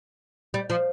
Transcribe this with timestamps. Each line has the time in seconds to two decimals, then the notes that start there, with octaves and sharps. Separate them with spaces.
0.54 G3
0.70 F3